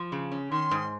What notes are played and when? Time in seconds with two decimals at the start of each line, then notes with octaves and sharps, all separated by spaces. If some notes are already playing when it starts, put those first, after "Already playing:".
Already playing: F3
0.12 C#3
0.32 C#4
0.52 D#3 C6
0.71 G#2